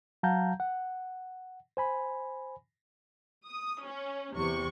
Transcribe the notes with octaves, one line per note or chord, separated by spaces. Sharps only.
F#3 F5 F#5 A5 A#5 G6
F#5
C5 G#5 B5
D#6
C#4
E2 C3 C#6